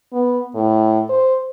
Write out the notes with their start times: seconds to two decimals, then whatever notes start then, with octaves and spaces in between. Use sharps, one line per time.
0.13 B3
0.55 A2
1.10 C5